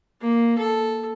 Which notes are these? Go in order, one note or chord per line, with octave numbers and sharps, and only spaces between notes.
A#3
A4